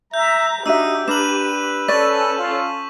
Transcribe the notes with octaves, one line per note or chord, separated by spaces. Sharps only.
E5 A#5 G6
D4 D#4 F#4 G4 E5 E6 D#7
D4 A#4 B4 E7 F#7
C#4 A4 D5 C#6 B6
F4